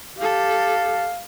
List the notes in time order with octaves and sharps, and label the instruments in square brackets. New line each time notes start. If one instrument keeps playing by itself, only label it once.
[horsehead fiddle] G4 A4 [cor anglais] F5